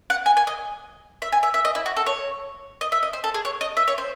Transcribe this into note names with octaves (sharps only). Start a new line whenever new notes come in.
F#5
G#5
G#5
D#5
E5
G#5
E5
E5
D#5
E4
F#4
A4
C#5
D#5
E5
D#5
C5
A4
G#4
C#5
D#5
E5
C#5
C5